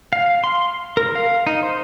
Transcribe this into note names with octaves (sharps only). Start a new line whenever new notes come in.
F5
C6
A#4
F5
D#4
C5